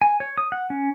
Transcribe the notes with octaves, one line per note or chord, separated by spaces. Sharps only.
G#5
C#5
D#6
F#5
C#4